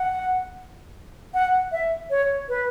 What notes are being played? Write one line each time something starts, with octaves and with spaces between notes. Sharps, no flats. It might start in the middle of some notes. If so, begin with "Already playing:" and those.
Already playing: F#5
F#5
E5
C#5
B4